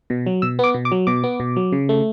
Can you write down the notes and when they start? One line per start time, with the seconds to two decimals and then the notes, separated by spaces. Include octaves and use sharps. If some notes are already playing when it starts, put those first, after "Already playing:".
0.10 B2
0.26 F#3
0.42 B2 E6
0.59 B3 D6
0.74 B2
0.85 D6
0.92 F#3
1.07 B2 D6
1.24 B3
1.40 B2
1.56 F#3
1.72 C#3
1.89 A3